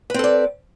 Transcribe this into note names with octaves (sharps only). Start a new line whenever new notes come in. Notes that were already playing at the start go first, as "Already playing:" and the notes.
C4 A4 B4 D5